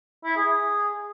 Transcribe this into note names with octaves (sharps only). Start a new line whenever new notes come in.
E4
G#4